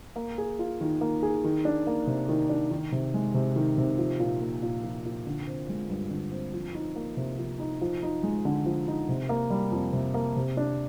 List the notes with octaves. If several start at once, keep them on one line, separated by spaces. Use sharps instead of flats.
A#3
G#4
F4
D#3
A#3
G#4
D#3
D4
A#3
C3
D#3
D4
D#3
C3
G#3
C3
D#3
C3
F3
A#2
A#3
A#2
F3
A#2
D3
C4
G#3
G2
D3
C4
F3
D#4
A#3
C3
F3
D#4
F3
D#4
G#3
D3
F3
D#4
C3
A#3
G3
F2
C3
A#3
C3
D4